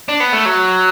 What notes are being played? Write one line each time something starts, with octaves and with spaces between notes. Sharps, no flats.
D4
B3
A3
F#3